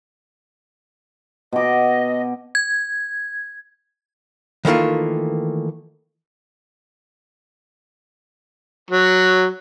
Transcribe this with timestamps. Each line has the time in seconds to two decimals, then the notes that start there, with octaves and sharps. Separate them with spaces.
1.53 B2 D#5 D6
2.55 G#6
4.65 D#3 E3 A3 A#3 F4
8.91 F#3